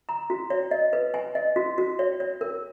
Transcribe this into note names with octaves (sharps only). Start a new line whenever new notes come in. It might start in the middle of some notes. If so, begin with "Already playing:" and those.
A#5
F#4
C#5
D#5
B4
G#5
D#5
F#4
F#4
C#5
C#5
A#4